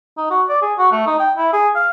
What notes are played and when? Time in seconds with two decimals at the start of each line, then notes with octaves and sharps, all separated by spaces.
0.17 D#4
0.31 F#4
0.49 D5
0.62 G#4
0.78 F#4
0.92 A3
1.07 D#4
1.20 G5
1.37 E4
1.53 G#4
1.75 F5